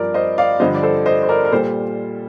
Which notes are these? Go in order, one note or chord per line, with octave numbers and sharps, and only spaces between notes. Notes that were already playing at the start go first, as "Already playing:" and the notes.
Already playing: G2 F3 A#4 D5
C5 D#5
D5 F5
G2 D3 F3 C5 D#5
D5
A4 C5
C5 D#5
C5
A#4 D5
A#4
A#2 G3 A4 C5